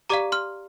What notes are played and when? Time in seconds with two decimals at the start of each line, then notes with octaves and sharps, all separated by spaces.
0.10 G4 D5 F5 A#5 D6
0.32 C6 F6